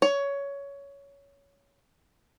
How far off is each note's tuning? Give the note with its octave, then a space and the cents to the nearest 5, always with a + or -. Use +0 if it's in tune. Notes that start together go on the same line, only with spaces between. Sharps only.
C#5 +15